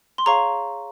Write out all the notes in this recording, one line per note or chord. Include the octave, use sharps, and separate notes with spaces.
C6
G#4 C#5 F5 A#5 C#6